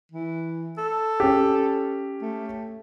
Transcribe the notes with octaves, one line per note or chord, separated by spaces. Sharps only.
E3
A4
C#4 G4
A3